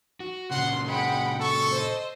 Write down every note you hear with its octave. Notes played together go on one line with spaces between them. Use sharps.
F#4
A#2 C#3 F#5 C6
G#3 F#5 G5 B5
A4 C#6
C5 D#5